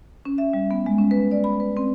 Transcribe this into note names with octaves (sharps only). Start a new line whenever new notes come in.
C#4
E5
G3
B3
G#3
C#4
B4
D5
B5
B4
C4